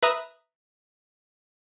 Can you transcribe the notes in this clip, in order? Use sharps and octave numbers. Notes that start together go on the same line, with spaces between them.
B4 E5 A#5 D#6